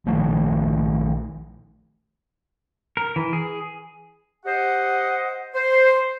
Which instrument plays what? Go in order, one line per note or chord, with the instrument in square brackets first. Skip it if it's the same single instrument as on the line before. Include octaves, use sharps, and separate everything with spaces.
[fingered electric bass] A#1 D#3 F3 A3
[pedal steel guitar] A#4
E3
G#4
[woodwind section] G4 C5 D#5 F#5
C5